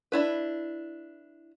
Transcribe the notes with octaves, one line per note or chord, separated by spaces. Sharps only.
D4 E4 B4